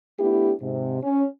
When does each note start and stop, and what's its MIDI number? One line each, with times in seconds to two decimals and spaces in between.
0.19 0.52 57
0.19 0.52 59
0.19 0.52 62
0.19 0.52 64
0.19 0.52 67
0.61 1.01 44
0.61 1.01 48
1.02 1.24 61